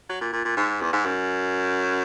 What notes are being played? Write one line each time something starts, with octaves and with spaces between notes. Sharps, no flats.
F#3
A#2
A#2
A#2
G#2
E2
G#2
F#2